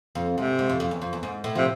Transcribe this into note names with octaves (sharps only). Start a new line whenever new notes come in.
F2
G#2 C3
G#2
F2
F2
E2
F2
E2
G#2
A2
C3 F3